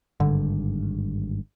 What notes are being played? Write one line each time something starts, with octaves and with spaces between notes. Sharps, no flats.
G#1 G2 D3